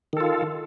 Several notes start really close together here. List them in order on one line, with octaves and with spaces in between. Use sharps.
D#3 A4 F4